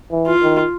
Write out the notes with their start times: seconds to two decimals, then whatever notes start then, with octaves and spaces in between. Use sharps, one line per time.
0.11 E3
0.27 F4
0.43 D#3